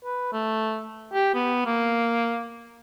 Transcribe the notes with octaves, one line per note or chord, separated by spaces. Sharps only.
B4
A3
G4
B3
A#3